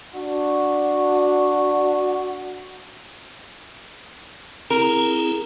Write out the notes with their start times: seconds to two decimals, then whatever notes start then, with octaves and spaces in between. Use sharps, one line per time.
0.14 D4 F#4
4.70 C4 E4 G#4 A#4